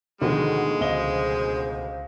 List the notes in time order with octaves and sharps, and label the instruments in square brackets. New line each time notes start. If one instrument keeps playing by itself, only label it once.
[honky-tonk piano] D2 B2 F3 [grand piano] D3 D#3 [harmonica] G#3 [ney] F#5
[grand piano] C#2 D#5 G7 [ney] C5